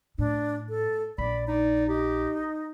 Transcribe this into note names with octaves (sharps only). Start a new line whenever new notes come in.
A2 D4
A4
A#1 D5 B5
D#4 D5
D#4 G4